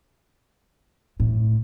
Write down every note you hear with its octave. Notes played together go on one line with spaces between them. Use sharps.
A2